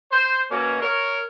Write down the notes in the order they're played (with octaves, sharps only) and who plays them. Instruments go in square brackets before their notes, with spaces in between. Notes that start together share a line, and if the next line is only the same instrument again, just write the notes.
[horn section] C5
B2 A#3 C#4
A#4 C#5